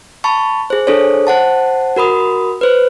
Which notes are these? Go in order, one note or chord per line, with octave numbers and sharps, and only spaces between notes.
A5 B5 C#6
G#4 C5
D4 G#4 A4 C5 C#5
C5 F#5 A5
F#4 A#4 B5 D#6
B4 C5